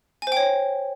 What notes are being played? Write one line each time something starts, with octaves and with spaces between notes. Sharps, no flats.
C5 C#5 G5 G#5